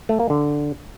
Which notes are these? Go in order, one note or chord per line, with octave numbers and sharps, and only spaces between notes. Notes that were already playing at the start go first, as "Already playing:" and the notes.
A3
A#3
D3